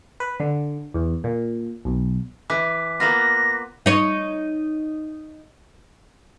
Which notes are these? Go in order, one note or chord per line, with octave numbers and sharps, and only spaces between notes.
B4
D3
E2
A#2
B1
E3 D6 F#6 B6
A#3 B3 F4 A#6
D#4 C#5